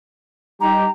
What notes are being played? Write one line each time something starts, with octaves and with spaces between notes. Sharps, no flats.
G3 D#4 G4 A#5